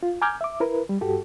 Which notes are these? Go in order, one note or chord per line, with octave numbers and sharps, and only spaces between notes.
F4
G#5 A#5 D6 F6 G6 G#6
E5 D6
E4 A#4 B4
G3
G2 F#4 G4 A4